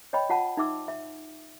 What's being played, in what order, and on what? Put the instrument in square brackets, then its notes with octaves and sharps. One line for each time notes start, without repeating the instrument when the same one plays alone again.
[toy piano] C#5 D#5 G5 B5
F4 F#5 A5
D#4 E5 D6 E6
E5